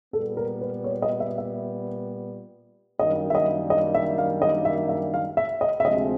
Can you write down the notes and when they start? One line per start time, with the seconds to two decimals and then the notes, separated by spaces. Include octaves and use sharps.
0.13 A#2 G3 B3 A4
0.37 A#4
0.61 B4
0.84 C#5
1.02 D#5
1.20 E5
1.38 E5
2.99 F#2 D#3 G3 A#3 D4 D#5
3.30 E5
3.35 D#5
3.70 D#5
3.94 E5
4.18 F5
4.42 D#5
4.65 E5
4.89 E5
5.14 F5
5.37 E5
5.61 D#5
5.80 E5
5.84 D2 C3 F3 G#3 C4 D#5